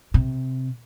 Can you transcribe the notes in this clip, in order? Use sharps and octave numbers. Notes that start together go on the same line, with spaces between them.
C3